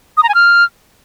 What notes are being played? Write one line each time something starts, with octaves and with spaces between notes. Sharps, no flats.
D#6
A#5
G#5
F6